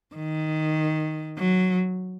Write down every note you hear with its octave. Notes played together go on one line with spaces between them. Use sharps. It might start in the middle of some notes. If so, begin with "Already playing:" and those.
D#3
F#3